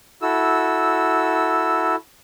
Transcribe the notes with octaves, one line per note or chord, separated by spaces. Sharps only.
E4 F#4 A4 E6